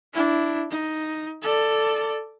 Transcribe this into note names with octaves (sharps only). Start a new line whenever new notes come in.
D4 E4
D#4
A4 D5